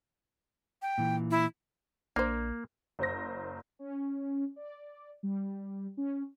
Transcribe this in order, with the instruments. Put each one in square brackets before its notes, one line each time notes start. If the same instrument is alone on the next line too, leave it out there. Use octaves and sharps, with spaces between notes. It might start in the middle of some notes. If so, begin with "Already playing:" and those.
[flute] G5
[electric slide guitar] A#2 E3
[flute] E4
[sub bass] A#1 [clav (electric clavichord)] A#3 [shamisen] D4 A#4 C5
[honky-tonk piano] F#1 C5 A#6
[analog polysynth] C#4
D5
G3
C#4